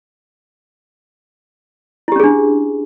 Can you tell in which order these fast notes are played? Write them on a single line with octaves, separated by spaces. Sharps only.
E4 G4 C#4 G#4 D4